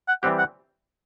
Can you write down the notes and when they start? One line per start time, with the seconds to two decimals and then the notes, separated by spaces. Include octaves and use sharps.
0.08 F#5
0.23 E3 G3 C4 G4 F#5
0.39 F#5